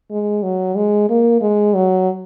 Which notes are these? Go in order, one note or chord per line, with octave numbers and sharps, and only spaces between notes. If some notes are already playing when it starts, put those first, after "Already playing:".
G#3
F#3
G#3
A#3
G#3
F#3